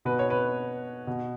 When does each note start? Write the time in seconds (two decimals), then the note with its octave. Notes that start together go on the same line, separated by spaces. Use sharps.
0.05 B2 B4
0.19 C#5
0.30 B4
1.07 B2